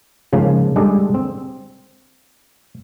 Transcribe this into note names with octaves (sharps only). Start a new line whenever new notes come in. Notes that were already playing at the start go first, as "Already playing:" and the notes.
G#2 C#3 F3 G#3 A#3
G3 G#3 D4 G#4 A4
C4